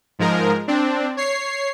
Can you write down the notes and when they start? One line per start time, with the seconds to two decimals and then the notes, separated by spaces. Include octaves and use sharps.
0.19 G#2 F3 G#3 A#4
0.68 C4 D4
1.17 C#5 C7